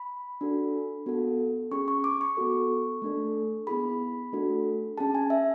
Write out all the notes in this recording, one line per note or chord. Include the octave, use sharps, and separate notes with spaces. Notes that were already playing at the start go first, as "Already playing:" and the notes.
Already playing: B5
D4 F#4 A4
B3 F#4 A4
C#4 G#4 C#6
C#6
D6
C#6
B3 F#4 A4
A3 D4 A4
B3 E4 G#4 B5
A3 D4 F#4 A4
C#4 G#4 A5
G#5
E5